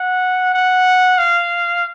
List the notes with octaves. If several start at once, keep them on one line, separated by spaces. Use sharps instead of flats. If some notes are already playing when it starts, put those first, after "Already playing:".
Already playing: F#5
F#5
F5